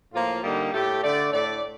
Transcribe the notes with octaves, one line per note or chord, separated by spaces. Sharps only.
A2 F3 A#3 F4
D3 G3 A#3 D#4
A2 A3 G4
D3 A3 D5
A2 A3 D5